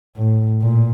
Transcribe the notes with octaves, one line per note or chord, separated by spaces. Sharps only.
A2
A#2